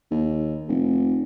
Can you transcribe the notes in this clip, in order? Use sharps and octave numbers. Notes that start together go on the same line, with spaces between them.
D#2
F1